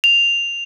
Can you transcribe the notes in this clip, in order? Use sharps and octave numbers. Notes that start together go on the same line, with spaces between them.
F7